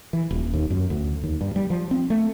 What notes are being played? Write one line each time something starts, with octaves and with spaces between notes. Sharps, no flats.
E3
D#1
D#2
F#2
D2
D#2
G2
G3
F3
C4
A3